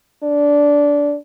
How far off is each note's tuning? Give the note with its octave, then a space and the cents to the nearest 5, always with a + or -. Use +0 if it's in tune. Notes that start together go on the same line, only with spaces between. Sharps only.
D4 -15